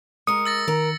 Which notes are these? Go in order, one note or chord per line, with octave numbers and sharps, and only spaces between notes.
G#3 A#4 D#6 C#7
E6 A6 A#6
D#3 A#4